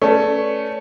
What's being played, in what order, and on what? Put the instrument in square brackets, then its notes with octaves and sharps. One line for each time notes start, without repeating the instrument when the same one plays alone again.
[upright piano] A3 C#4 [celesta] B4 D5 A5 C#6